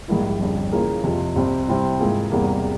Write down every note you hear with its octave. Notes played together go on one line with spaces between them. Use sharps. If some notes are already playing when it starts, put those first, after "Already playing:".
A#1 G#2 G3 A#3 E4
G1 F2 C#3 G3
C#3 E3 A#3 F4 G#4
F2 C3 F3
C2 C3 G3 C4
C3 G3 C4 E4
G#2 E3 A#3 F4 G#4
E1 E2 C3 G3 A#3